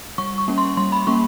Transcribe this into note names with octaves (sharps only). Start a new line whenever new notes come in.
G3 C#6
C#6
A#3 C#4
C6
G3 C6
B5
A#3 C#4 C#6